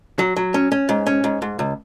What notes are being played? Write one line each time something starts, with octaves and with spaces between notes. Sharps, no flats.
F#3
F#3
C#4
C#4
G#2
C#4
G#2
G#2
C#2